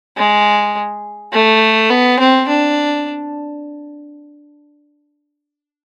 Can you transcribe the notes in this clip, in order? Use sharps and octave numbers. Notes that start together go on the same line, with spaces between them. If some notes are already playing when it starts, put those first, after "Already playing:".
G#3
A3
B3
C4
D4